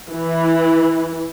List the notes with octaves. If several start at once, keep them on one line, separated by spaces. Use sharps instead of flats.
E3